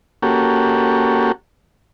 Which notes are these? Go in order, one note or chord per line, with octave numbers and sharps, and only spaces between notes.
A#3 C#4 F#4 G4 A4